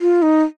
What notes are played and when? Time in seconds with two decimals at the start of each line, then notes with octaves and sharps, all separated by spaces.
0.01 F4
0.22 D#4